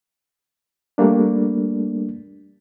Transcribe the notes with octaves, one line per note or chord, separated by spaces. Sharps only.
G3 A3 A#3 D4